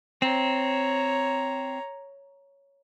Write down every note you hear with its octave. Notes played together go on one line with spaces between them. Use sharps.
C4 C#5 A#5